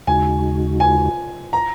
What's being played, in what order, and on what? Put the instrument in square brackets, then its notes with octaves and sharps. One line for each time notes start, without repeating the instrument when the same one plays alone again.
[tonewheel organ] D#2 C#3 G#3 D#4 F#4 [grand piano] G#5
[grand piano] G#5
A#5